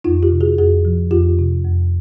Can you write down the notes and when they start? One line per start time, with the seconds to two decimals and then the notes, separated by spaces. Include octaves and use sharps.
0.04 F2 D#4 F4
0.23 F4 G4
0.32 C3
0.41 F#4 G#4
0.58 F2 F#4 G#4
0.85 F3
1.11 F2 F4 G4
1.39 C3
1.64 F2